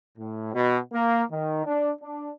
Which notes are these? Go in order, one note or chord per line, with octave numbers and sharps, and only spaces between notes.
A2
B2
A#3
D#3
D4
D4